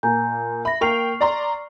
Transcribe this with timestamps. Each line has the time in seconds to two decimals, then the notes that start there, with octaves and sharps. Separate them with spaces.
0.03 A#2 G#5 A#5 G6
0.65 E5 B5 A#6
0.81 A#3 G5 C#6 F6 C7 F7
1.21 D5 A#5 C6